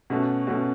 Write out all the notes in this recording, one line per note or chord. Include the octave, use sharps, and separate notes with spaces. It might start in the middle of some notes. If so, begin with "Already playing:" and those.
B2 A3 C#4 F#4
B2 A3 C#4 F#4